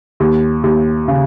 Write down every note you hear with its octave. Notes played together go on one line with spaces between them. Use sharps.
D#2
D#2
C#3